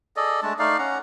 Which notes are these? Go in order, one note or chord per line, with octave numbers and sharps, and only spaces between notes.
G#4 A4 D5 D#5
G#3 A3 D4 A5
A3 D#4 D5 F5
C#4 F#5 A#5